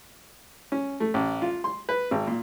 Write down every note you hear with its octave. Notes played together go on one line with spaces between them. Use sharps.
C#4
A3
A1
F4
C6
B4
G#1
A#2